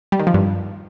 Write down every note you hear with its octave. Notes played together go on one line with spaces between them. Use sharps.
G3
D#3
F3
G2